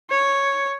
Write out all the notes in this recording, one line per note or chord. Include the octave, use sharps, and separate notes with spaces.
C#5